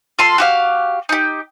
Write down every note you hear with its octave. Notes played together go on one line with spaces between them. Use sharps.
F4 A4 C6
F#4 G4 F5
D#4 G4